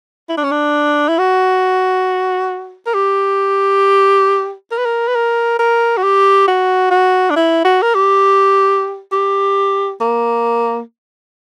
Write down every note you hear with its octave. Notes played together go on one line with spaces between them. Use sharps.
E4
D4
C#4
D4
E4
F#4
A#4
G4
A#4
B4
A#4
B4
A#4
A#4
F#4
G4
F#4
F#4
D4
E4
F#4
A#4
G4
G4
A#3